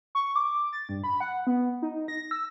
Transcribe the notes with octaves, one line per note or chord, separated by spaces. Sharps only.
C#6
D6
A6
G2
B5
F#5
B3
D#4
A#6
E6